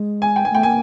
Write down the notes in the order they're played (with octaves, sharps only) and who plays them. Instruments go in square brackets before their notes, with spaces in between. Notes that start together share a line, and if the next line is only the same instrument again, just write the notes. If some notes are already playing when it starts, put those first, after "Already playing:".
Already playing: [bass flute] G#3
[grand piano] G#5
G5
G#5
[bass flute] A3 [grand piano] G5
[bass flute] A#3 [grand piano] G#5